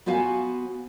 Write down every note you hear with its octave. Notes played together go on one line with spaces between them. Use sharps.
B3 F#4 C5 F5 G#5